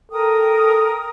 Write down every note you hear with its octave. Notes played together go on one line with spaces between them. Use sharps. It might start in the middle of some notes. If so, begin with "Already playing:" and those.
A4 A#4 G5 D#6